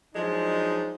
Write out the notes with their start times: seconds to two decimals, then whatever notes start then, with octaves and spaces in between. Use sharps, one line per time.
0.15 F3 F#3 G#3 D4 D#4